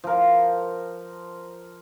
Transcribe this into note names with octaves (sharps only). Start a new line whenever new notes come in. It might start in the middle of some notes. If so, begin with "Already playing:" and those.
F3 A#4